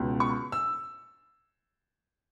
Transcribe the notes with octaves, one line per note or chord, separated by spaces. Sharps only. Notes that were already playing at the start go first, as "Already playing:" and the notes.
Already playing: C#2 B2
C#6
E6